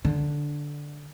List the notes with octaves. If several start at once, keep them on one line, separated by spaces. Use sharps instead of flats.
D3